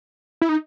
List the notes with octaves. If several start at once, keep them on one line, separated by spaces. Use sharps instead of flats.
E4
D#4